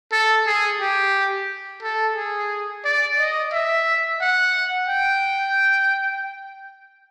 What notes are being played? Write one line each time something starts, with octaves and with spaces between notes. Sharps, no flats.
A4
G#4
G4
A4
G#4
D5
D#5
E5
F#5
G5